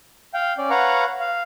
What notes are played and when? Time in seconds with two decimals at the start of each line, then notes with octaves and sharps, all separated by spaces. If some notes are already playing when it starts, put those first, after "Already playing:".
0.34 F5 G5
0.58 C#4 D5
0.70 B4 C#5 F5 F#5 A#5 C#6
1.20 F5